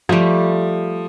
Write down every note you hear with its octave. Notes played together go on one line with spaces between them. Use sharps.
F3 G3 A3